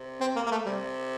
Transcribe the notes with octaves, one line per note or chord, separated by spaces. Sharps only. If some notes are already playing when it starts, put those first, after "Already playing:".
Already playing: C3
C4
A#3
A#3
A3
C3 G3